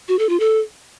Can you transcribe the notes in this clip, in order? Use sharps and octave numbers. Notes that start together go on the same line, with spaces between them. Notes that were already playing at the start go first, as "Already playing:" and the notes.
F#4
A4
F4
A4